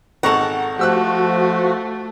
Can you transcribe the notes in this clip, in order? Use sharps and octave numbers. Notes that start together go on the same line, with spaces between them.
G#1 A4 F#5 A#5 C#6
F3 A3 F#4 G4 E6 F#6